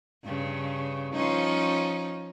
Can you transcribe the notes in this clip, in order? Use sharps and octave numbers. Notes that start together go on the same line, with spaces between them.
G2 C#3
F3 C#4 D#4